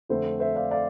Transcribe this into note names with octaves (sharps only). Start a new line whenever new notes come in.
F2 D3 A3 C4 A4 C5
C5 E5
D5 F5
D5 F5